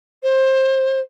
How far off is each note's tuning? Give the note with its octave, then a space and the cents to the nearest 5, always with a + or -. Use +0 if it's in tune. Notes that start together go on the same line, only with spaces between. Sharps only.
C5 +20